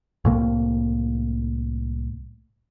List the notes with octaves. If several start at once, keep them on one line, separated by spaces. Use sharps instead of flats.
C2 A2 A#3